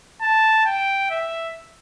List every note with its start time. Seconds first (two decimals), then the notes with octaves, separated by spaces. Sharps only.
0.22 A5
0.65 G5
1.11 E5